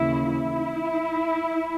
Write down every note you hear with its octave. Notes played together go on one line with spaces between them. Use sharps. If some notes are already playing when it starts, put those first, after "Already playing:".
Already playing: D#2 C#3 E3 E4
E4